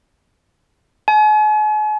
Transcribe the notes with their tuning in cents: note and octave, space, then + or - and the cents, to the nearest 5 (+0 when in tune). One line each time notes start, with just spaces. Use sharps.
G#5 +45